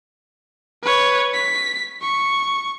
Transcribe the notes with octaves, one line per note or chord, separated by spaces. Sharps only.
B4 C#5
B6
C#6